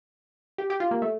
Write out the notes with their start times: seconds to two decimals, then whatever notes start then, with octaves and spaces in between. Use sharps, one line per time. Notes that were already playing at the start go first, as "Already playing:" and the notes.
0.58 G4
0.70 G4
0.80 F4
0.91 A#3
1.02 A3